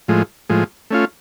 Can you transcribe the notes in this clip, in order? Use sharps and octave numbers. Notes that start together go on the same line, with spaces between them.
A2 F3 G#3
A2 F3 G#3
A3 C#4 F4